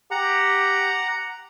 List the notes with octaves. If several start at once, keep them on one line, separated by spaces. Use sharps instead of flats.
G4 F#5 A#5